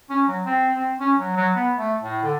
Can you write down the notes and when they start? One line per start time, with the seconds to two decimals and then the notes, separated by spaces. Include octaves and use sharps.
0.10 C#4
0.28 F#3
0.45 C4
0.74 C4
1.00 C#4
1.18 F#3
1.36 F#3
1.54 B3
1.77 A3
2.02 A2
2.23 D3